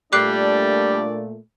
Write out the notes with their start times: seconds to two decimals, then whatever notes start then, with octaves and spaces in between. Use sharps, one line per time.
0.13 A#2 G3 A3 D4 D5 D6 F#6 C7